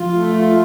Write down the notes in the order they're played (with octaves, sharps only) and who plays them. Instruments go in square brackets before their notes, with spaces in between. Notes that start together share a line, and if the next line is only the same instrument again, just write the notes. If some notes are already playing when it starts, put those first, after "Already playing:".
Already playing: [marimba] F3 [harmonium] F4
[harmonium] A3
F4